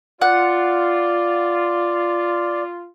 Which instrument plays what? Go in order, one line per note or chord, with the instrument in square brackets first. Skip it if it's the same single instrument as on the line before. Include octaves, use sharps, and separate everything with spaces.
[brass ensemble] F4 [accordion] D5 [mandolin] F#5